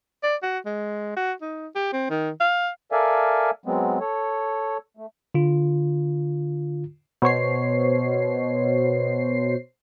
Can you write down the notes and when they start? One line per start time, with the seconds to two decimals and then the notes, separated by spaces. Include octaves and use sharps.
0.23 D5
0.43 F#4
0.65 G#3
1.16 F#4
1.42 D#4
1.75 G4
1.93 C4
2.10 D#3
2.40 F5
2.92 A4 A#4 D5 E5 F5 G#5
3.66 F#3 G#3 B3 C4
4.00 A4 C#5
4.97 A3
5.34 D3 F4
7.22 B2 C5 C#5 C7